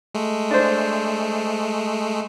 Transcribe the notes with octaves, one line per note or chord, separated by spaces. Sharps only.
G#3 A3
D4 C5